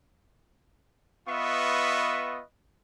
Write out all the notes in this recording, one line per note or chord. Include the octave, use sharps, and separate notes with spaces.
B3 F4 B4 D#5 E5 C#6